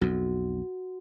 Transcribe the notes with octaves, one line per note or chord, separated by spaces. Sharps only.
B1 F2 F#4